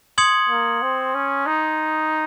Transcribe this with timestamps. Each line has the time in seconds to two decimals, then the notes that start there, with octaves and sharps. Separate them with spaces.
0.18 C6 D#6 G#6 C#7 F#7
0.49 A#3
0.82 C4
1.14 C#4
1.46 D#4